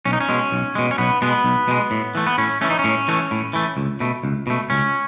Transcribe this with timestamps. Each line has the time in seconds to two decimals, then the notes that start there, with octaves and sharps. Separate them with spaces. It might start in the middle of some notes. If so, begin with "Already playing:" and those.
0.05 B1 C#4
0.13 D#4
0.21 C#4
0.29 B2 G#3
0.52 B1
0.75 B2 G#3
0.91 C#4
0.98 B1 B3
1.22 B2 G#3 B3
1.44 B1
1.68 B2 G#3
1.91 A2
2.15 E3 A3
2.27 B3
2.38 A2 C#4
2.61 E3 A3 C#4
2.70 D#4
2.79 C#4
2.84 A2
3.08 E3 A3
3.31 A2
3.53 E3 A3
3.77 C#2
4.00 B2 A3
4.24 C#2
4.47 B2 A3
4.70 C#2 C#4